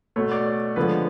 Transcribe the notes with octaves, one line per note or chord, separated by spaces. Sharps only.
B2 A3 C#5
D5
C#5
D3 F3 G#3 B3 B4